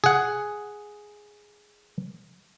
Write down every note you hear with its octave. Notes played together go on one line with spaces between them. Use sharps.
G#4 F#5